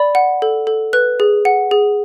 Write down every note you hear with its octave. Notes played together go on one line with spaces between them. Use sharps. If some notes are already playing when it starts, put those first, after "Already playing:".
Already playing: D5 B5
F#5
A4
A4
B4 F#6
G#4
F#5
G#4